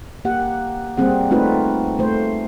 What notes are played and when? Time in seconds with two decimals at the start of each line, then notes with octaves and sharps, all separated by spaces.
0.25 A#3 G4 F#5
0.97 G3 A#3 C4 G#4 F#5
1.31 A3 C4 D#4 F4 F#4 B4
1.99 A3 C5